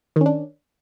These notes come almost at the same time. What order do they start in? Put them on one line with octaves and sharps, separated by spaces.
D#3 C#4 D4